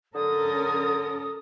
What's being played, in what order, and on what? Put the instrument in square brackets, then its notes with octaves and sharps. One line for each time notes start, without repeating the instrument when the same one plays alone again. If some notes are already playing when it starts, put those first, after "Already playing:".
[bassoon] D3 [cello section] C#4 A4 A#4 [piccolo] D#6